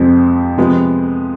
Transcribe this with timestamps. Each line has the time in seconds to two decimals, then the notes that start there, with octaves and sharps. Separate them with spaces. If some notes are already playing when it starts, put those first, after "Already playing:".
Already playing: F2 C3 F3 G#3 C4
0.57 C3 F3 G#3 B3